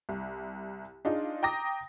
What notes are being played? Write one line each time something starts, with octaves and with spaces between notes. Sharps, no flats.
C2
D4 D#4 F4 G#4
G5 A#5 D6 D#6 A#6